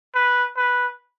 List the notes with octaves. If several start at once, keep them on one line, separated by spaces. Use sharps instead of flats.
B4
B4